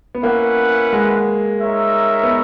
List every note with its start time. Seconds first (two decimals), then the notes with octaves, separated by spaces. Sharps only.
0.15 B3
0.23 A#3 C#4 E4 B4 F#5
0.92 G#3
1.62 D#4 A#4 C#5 E5
2.23 B3